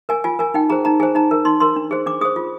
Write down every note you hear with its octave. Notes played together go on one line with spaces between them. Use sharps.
A#4 G#5
F4 G#5
A#4 G#5
D#4 G5
G#4 C5 A#5
D#4 A#5
G#4 C5 G#5
D#4 A#5
A#4
D#4 C6
A#4 C6
D4
G#4 C5
D4 D6
G#4 C5 D#6
F4